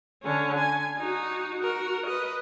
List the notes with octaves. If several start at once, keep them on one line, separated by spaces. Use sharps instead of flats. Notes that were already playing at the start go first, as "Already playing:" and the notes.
D3 C#4
G#5
D#4 F#4
F#4 A#4
B4 D#5